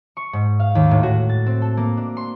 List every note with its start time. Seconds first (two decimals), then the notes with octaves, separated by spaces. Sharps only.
0.17 C#6
0.33 G#2
0.60 F5
0.75 D#2
0.91 A2
1.03 F#4
1.29 A6
1.46 C4
1.62 A4
1.77 A#3
1.97 D4
2.17 C6